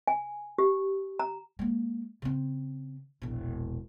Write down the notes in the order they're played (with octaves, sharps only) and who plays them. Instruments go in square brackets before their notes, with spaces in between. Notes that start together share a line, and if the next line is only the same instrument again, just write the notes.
[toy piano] G#5
G4
A#5
[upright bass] G#3 A#3
C#3 C4
E1 A#1